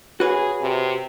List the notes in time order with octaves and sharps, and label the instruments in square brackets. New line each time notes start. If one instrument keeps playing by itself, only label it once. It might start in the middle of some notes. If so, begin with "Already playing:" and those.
[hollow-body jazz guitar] F#4 B4 C#5 [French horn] G#4
[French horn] C3